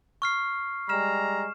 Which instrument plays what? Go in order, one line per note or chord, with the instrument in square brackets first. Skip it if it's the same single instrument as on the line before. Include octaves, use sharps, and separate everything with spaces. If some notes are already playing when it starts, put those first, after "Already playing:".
[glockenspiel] C#6 F6 C7
[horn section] G3 G#3 A#5 [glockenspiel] F6 E7